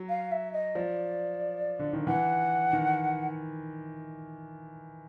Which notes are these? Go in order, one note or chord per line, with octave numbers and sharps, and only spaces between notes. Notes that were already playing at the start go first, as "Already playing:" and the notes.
Already playing: F#3
F5
E5
D#5
F3 D5
D3
D#3
E3 F#5
D#3